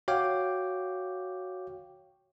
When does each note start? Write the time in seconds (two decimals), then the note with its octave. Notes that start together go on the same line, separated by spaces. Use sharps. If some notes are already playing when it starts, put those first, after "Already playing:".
0.08 F#4 C#5 F5 G5 D6